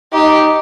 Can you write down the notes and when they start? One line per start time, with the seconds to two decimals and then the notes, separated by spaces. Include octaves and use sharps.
0.13 D#4 G4